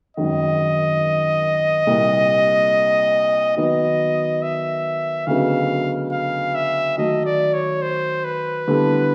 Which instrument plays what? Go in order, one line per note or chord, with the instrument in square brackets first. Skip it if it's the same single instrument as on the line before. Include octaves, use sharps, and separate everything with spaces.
[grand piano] G#1 F#2 D#3 [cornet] D#5
[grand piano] C2 A#2 G3 A#3
[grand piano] D#3 F#3 B3 D#4 F#4 [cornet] D#5
[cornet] E5
[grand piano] D2 C#3 F#3 B3 D#4 [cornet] F5
[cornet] F5
E5
[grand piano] D#3 F#3 A3 [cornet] D#5
[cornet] D5
C#5
C5
B4
[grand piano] D3 G3 B3 E4 A4